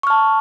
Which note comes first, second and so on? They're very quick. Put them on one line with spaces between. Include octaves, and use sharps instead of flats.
C#6 F6 A5